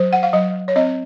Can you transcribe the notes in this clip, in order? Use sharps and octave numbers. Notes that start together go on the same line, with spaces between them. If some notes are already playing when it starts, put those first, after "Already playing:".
Already playing: F#3 C5
F#5
F5
F#3 D#5
C#5
C4 D#5